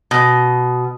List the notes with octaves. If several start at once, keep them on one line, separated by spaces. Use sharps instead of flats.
B2